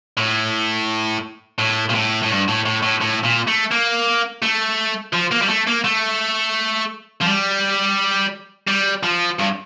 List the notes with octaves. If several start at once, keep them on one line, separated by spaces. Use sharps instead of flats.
A2
A2
A#2
A2
A2
G2
A2
A2
A2
A2
A#2
A3
A#3
A3
F3
A#3
G3
A3
A#3
A3
F3
G3
G3
F3
G2